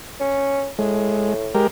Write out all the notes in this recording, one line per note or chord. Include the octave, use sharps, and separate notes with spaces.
C#4
A2 G#3
G#3 G4 A#4